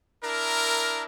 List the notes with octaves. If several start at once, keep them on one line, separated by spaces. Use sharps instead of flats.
D4 E4 A#4